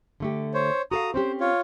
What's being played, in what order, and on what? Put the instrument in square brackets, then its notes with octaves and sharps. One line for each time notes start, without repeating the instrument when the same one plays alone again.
[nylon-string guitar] D3 A3 G4
[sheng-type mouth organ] C5 C#5
[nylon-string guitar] F#4 A4 F5 [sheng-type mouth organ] A#5 D#6
[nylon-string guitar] C4 C#4 G4 [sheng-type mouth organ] C5
[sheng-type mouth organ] F4 C#5